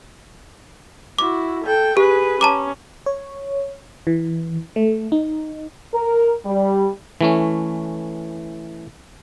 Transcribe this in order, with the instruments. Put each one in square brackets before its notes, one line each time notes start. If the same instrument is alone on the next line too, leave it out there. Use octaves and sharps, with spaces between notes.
[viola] E4 F#4 [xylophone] D6
[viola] A4 G5
[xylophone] G4 [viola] G#4 B4
[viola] C#4 [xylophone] A5 A#5 D6
[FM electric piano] C#5
E3
A3
D#4
[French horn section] A#4
G3
[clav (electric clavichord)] E3 A3 C#4